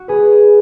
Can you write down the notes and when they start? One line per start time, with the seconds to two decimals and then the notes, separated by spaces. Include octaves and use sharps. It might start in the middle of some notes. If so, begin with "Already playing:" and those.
Already playing: F#4
0.08 G#4 B4